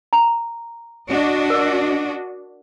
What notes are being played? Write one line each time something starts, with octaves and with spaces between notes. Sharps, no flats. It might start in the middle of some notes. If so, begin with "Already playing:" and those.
A#5
D4 F#4 D#5
A#4